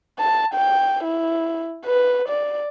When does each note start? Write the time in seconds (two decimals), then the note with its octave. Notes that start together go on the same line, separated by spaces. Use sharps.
0.20 A5
0.55 G5
1.04 E4
1.86 B4
2.29 D5